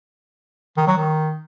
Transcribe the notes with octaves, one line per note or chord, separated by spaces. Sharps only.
D#3
F#3
D#3